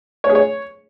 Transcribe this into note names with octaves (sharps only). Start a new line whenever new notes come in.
C#5
G#4
C#5